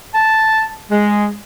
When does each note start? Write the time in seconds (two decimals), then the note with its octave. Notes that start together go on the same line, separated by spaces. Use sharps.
0.14 A5
0.90 G#3